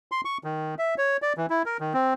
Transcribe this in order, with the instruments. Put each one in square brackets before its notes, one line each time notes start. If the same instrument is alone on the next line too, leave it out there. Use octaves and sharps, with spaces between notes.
[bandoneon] C6
C#6
D#3
E5
C#5
D5
E3
E4
A#4
D#3
C4